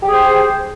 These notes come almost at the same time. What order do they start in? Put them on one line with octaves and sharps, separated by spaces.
G4 G#4 C5